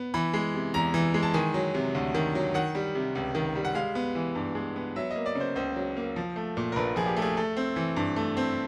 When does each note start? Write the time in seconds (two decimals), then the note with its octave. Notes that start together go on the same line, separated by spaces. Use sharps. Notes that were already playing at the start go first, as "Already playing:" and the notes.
Already playing: B3
0.14 E3 B5
0.34 G#3
0.54 C3
0.74 E2 A#5
0.94 E3
1.14 G#3
1.23 A5
1.34 D#3 G#5
1.54 F#3
1.74 C3
1.95 D2
2.15 D#3
2.35 F#3
2.54 D#3 F#5
2.75 G3
2.95 C3
3.15 C#2
3.35 D#3
3.55 G3
3.65 F#5
3.75 G#3 F5
3.95 B3
4.15 E3
4.35 G2
4.55 G#3
4.76 B3
4.96 F#3 E5
5.11 A#3 D#5
5.26 D5
5.35 C#3
5.40 C5
5.56 C#2 C5
5.76 F#3
5.97 A#3
6.16 F3
6.36 A3
6.57 A#2
6.72 A#4
6.76 A#1 B4
6.96 F3 G#4
7.06 G4
7.16 A3
7.22 G#4
7.36 A3 A4
7.57 C4
7.76 E3
7.96 G2
8.16 A3
8.37 C4